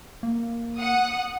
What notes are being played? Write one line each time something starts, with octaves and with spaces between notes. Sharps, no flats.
A#3
F#5 D#6